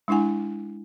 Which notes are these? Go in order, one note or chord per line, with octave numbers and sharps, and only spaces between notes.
G#3 D4 E4 F#5 G#5